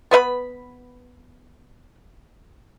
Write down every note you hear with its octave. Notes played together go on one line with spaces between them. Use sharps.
B3 B4 E5 B5